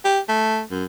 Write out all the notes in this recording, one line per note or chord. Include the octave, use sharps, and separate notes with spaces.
G4
A3
F#2